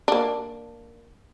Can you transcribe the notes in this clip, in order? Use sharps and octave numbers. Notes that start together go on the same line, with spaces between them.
A#3 D4